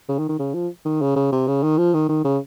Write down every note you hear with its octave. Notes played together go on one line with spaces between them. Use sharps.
C#3
D#3
D#3
C#3
F3
D#3
C#3
C#3
C3
C#3
D#3
F3
D#3
D#3
C#3